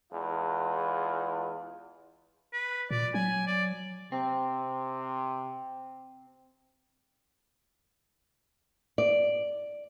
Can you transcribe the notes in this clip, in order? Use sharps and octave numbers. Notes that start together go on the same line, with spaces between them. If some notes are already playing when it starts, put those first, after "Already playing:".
E2 G#3 F4
B4
A#2 D5
F#3 G#5
D5
C3 C4
D5